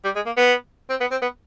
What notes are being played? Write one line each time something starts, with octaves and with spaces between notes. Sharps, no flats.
G3
G#3
A#3
B3
C4
B3
C4
B3